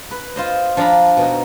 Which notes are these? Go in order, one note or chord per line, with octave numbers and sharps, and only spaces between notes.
B4
F4 C5 D#5
F3 D4 F5 A#5 B5
B2 D#4